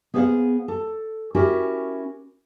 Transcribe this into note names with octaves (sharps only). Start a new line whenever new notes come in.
B3 G#4 C5 D5 F5 F#5
A4
C#4 E4 F#4 G4 A#4